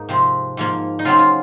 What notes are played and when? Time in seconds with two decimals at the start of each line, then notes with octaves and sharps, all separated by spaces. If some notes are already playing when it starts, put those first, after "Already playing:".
Already playing: G#2 A#3 D#4
0.09 C3 F3 C4
0.57 G#2 F3 A#3
0.99 D#4
1.05 C#3 F#3 C4 F4
1.19 F4